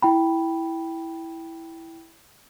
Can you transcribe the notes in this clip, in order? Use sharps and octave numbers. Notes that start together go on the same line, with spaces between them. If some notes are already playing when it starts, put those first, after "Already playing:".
E4 G5 B5